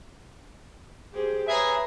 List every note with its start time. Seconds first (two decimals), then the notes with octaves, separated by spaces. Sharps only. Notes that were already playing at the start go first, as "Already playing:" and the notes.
1.12 G4 G#4 C5
1.48 G#4 B4 C#5 E5 A#5